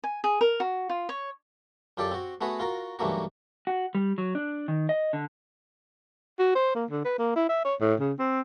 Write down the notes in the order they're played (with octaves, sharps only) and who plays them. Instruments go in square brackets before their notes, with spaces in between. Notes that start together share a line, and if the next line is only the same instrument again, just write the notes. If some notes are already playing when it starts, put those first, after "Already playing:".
[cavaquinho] G#5
G#4
A#4
F#4
F4
C#5
[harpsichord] F#2 F4 G4 A4 D5
C4 F#4
A3 B3 F#4 G#4 B4
F4 F#4 A#4
B1 G2 E3 A3 A#3 F#4
[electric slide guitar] F#4
G3
F#3
D4
D#3
D#5
D3
[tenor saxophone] F#4
C5
A#3
D3
B4
A#3
E4
E5
C#5
A2
C#3
C4